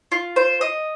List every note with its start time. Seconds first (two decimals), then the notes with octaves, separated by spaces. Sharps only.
0.12 F4
0.36 C5
0.61 D#5